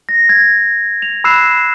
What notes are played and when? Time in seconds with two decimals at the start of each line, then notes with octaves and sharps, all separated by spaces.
0.09 A#6
0.29 G#6
1.02 F7
1.24 B5 E6 F#6 C7 E7